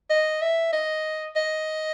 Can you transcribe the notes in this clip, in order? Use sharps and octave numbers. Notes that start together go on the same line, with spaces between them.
D#5
E5
D#5
D#5